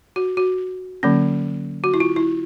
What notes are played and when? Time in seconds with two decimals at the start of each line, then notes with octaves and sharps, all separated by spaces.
0.16 F#4
0.37 F#4
1.03 D3 F#3 A#3 C#4
1.84 F#4
1.94 E4
2.00 F4
2.16 E4